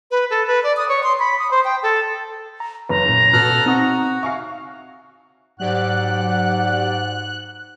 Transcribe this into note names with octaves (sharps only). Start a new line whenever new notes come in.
B4
A4
B4
D5
D#6
C#5
C6
B5
D#6
C5
G5
A4
A#5
F#1 B4 A#5
A#2
B2 A4 F6 F#6
C4 D#4 F#4 D#6
E5 F5 G#5 C#6
G#2 F#3 G4 D5 F#5 F#6